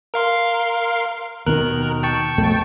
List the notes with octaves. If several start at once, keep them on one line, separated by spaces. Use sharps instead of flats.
A#4 F5 C6
D#2 B2 D#3 A#4 F#6
G5 A5 C#6
F2 B2 A3